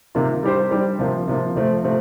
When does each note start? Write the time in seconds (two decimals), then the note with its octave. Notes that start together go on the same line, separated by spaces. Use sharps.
0.15 C3 D#3 A#3 F4
0.43 G3 D4 G4 C5
0.71 G3 D4 G4 C5
0.99 C3 F3 A#3
1.28 C3 F3 A#3
1.55 C3 F3 A3 C4
1.84 C3 F3 A3 C4